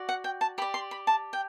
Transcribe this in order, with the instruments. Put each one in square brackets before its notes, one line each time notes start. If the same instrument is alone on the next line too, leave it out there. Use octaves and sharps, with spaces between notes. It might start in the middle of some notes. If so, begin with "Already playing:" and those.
Already playing: [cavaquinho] F#4 D5
F#5
G5
A5
G4 B5
D5
C6
B5
A5
G5